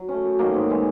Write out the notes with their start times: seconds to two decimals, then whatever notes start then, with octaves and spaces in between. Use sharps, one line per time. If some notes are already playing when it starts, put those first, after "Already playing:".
Already playing: F#3
0.09 A3 C#4
0.24 F#2
0.39 D#3 F#3 A#3
0.54 G#2
0.69 E3 G#3 C#4